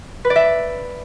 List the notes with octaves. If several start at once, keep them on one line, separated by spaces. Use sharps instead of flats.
B4
D5
E5